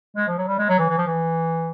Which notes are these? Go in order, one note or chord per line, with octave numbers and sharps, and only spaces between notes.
G#3
F3
F#3
G3
G#3
F#3
E3
E3
F3
E3